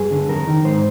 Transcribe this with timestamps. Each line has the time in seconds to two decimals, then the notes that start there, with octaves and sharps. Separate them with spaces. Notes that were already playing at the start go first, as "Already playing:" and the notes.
Already playing: G2 G#4
0.11 D3
0.29 F2 A#4
0.47 D#3
0.65 G#2 C5